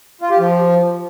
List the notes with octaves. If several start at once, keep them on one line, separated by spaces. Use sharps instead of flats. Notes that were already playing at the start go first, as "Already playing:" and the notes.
F4
G4
F3